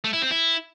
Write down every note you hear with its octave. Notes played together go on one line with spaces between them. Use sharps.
A3
E4
C4
E4